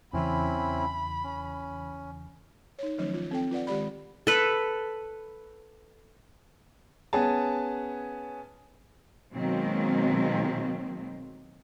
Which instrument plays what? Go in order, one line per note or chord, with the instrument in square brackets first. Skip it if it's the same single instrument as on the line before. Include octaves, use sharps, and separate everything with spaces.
[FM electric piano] E2 C#3 E3 [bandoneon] C4 C#4 E4 [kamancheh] B5
[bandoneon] C#4
[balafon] D#4 C#5
D#3 F3 F#3 A3 C#4 C#5
F4
C4 A4 G5
F4 B4 D5 F#5
D#3 G#3 G4 D5 B5
[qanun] A4 B4
[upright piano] B3 C#4 G#4 A5
[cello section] B2 D#3 F#3 G#3 A#3 C4